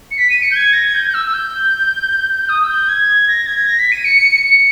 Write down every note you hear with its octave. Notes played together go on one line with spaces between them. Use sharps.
C#7
B6
D#7
C#7
G6
G#6
A#6
G#6
G6
G6
E6
E6
G6
D#6
E6
G6
G#6
A#6
G#6
A#6
B6
D#7
C#7
C#7